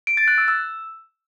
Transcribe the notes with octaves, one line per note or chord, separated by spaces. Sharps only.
D7
A6
F#6
E6
E6